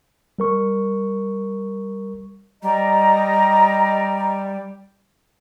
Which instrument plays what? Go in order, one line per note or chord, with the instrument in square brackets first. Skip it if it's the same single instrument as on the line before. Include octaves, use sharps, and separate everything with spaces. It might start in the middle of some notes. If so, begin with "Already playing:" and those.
[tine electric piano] G3 A#4 C#6
[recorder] G3 [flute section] D#5 A#5